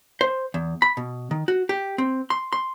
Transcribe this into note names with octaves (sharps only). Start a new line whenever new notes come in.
C5
E2
B5
B2
D#3
F#4
G4
C4
C6
C6